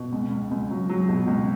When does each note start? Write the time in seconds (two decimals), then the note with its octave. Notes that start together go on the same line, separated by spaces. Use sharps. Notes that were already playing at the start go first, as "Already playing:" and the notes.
Already playing: B2
0.12 C#2
0.31 C#2
0.51 C#2
0.71 F#3
0.89 F#3
1.09 B2
1.27 C#2